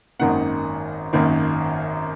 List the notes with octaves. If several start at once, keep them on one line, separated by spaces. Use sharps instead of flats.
G#1 F#2 D#3 A#3 F#5
G#1 F#2 D#3 A#3